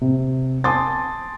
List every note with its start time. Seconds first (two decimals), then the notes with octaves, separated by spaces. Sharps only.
0.01 C3
0.64 G#5 A5 C6 D6 D#6 A6